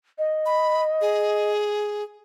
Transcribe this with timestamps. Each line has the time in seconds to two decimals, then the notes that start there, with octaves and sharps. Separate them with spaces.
0.18 D#5
0.46 B5
1.01 G#4